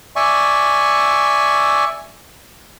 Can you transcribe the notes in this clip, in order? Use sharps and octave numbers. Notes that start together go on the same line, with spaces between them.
D5 E5 G#5 C#6